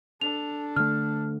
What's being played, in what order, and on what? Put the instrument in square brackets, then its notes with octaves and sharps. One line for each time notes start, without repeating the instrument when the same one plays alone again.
[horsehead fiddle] D4 A4 [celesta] F7
[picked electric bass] D3 A3 [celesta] F6